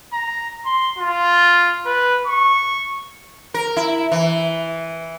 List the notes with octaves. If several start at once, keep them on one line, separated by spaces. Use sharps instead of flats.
A#5
C6
F4
B4
C#6
A#4
E4
E3